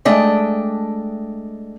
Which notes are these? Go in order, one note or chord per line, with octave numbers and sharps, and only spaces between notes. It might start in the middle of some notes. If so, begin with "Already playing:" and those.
G#3 A3 D4 D#5 G5